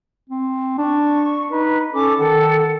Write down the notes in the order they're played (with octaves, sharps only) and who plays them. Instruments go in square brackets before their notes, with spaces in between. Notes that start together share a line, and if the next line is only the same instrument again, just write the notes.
[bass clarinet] C4
[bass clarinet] D4 [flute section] C#6
[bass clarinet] D#4 [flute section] B4
[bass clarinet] C#4 [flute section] A4 D6
[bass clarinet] D#3 [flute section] A4 F#5